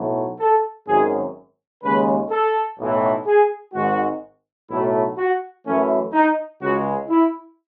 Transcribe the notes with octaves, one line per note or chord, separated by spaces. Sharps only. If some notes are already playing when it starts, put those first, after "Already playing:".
Already playing: B1 A2 F#3 A3
A4
G#1 F#2 D#3 F#3 G#4
D#2 C#3 G#3 B4
A4
B1 A2 E3
G#4
G#1 G#2 D#3 G#3 F#4
B1 A2 F#3 A3 E4
F#4
F#2 E3 A3 C#4
D#4
C#2 C#3 G#3 F#4
E4